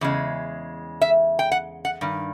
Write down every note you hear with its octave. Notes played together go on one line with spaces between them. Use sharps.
E2 C#3 G#3
E5
G5
F#5
F#5
G2 D#3